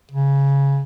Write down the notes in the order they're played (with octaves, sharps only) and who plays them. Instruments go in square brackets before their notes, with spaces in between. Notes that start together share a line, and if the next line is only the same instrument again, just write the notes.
[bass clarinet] C#3